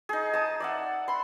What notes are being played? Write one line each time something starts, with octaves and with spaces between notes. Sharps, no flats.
D#4 G#4
A5 D#6
D5 E5 F#5
B5 C6